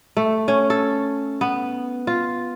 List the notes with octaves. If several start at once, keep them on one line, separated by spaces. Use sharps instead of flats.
A3
C#4
A4
B3
F4